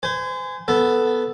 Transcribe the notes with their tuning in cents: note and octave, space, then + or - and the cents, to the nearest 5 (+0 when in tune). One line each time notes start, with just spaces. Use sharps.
C5 -40 G#5 -5
B3 +0 A4 +0